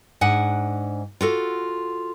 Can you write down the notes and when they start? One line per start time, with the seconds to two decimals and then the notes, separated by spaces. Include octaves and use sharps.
0.21 G#2 D4 F#5 G#5
1.21 F4 F#4 A4